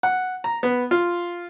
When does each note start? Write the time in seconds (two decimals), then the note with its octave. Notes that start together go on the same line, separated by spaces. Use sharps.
0.03 F#5
0.44 A#5
0.63 B3
0.91 F4